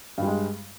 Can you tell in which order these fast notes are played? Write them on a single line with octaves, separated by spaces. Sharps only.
G2 G3 G#3